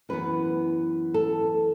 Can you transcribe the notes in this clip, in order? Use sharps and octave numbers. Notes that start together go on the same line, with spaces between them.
F#2 E3 B3 B4
A4